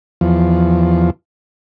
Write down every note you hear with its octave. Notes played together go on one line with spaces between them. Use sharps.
E2 F3